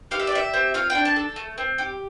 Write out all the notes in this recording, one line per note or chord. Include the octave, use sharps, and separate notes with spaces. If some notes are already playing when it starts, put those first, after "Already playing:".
G4 F5
E5
D5
G4 E5
C4
F4 F5
G5
D4
A5
A4
A3
C4
G4